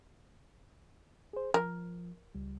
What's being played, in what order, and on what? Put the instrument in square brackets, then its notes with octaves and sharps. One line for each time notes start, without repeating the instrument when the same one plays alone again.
[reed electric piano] G#4 C5
[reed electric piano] F3 [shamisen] A#4
[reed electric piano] C#2 G3